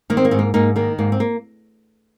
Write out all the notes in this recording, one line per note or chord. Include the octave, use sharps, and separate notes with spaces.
D#3 A#3
C4
A#3
G#2 C4
A#3
G#2 A#3 D#4
D#3 A#3
G#2 A#3
C4
A#3